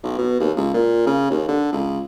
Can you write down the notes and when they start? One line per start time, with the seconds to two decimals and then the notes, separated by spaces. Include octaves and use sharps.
0.03 B1
0.18 B2
0.40 D#2
0.57 C#2
0.74 A#2
1.07 C#3
1.30 D#2
1.48 D3
1.73 C#2